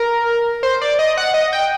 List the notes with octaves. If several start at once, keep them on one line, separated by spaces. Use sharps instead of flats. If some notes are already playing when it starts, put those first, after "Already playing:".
Already playing: A#4
C5
D5
D#5
F#5
D#5
G5